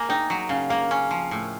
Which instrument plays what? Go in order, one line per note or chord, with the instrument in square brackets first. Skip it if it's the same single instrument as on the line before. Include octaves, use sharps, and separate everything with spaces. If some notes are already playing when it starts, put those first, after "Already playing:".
Already playing: [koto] A#3 [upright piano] G#5
[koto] D#4 [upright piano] G5
[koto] F#3
[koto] C#3 [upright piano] F5
[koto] A#3 [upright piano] F5
[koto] C#4
F3
A2